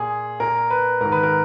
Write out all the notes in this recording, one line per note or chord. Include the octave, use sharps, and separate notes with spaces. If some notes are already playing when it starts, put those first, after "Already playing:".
Already playing: A#2 G#4
A#2 A#4
B4
G#2 D#3 A#4
B4
A#4